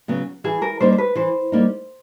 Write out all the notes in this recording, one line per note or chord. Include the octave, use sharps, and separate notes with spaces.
C#3 F#3 B3
E3 G#4
A#4
G3 A#3 D#4 C5
C5
B4
E3 C5
G3 A#3 D#4